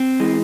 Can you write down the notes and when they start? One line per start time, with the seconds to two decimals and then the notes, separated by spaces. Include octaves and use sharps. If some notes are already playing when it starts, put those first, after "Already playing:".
Already playing: C4
0.20 E3 G#3